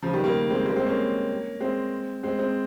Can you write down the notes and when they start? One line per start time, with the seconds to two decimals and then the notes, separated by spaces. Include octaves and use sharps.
0.03 C#3 F3
0.13 D#3 G3
0.24 G3 A#3
0.50 G#3 C4
0.65 G3 A#3
0.76 G#3 C4
0.87 A#3 C#4
1.60 G#3 C4
2.23 G#3 C4
2.39 G#3 C4